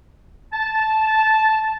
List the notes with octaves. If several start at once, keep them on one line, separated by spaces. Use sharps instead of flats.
A5